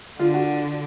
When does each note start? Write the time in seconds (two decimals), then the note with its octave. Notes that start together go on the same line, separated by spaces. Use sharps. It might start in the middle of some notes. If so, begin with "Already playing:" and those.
0.19 D3 F4
0.34 F#4